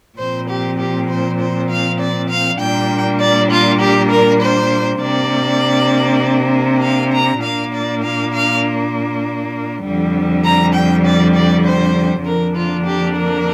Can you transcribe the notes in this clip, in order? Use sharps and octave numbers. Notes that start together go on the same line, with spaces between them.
A#2 F3 C4 C5
G4
G4
C5
C5
F5
D5
F5
A#2 G3 A#3 D4 G5
D5
F4
G4
A#4
C5
C3 A#3 D4 D5
F5
A#5
A#2 A#3 D4 F5
D5
F5
F5
F2 D3 G3
A#5
G5
D5
D5
C5
F2 D3 F3 A#3 D4 A#4
F4
G4
A#4